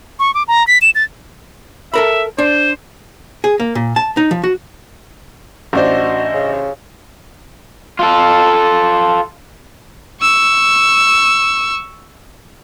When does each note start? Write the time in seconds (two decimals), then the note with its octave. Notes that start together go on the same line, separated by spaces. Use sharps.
0.20 C#6
0.34 D6
0.48 A#5
0.67 B6
0.82 E7
0.95 A6
1.94 A4 A#4 E5 B5
2.38 D4 C5
3.44 G#4
3.60 A#3
3.75 A#2
3.96 A5
4.17 D#4
4.31 F3
4.44 F#4
5.73 A1 D4 F#4 C5 D#5
6.34 C#3
7.99 F4 A4
10.21 C#6 E6